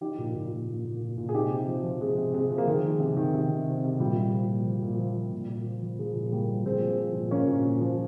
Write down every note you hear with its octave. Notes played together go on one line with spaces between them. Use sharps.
F3 D#4 G4
A#2
A#2
A#2
A#2
A#2
A#2
A#2
G#4
C3 D#4 G4
C3
F3
F3
C3 G#3
C3
C3 G#3
F3
A#3
D#3 G#3
D#3
C3
D#3
C3
C3
C3
C3
A#2 G3
A#2
F3
A#2
F3
A#2
F3
F3
A#2
A#2
F3
F3
F3 G#3
A#2
A#2 G3 A#3
F3
A#2 G#3 C4
F3
F3
A#2
F3 A#3 C#4
A#2
A#2
F3